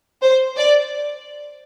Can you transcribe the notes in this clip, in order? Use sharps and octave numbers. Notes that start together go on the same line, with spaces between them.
C5
D5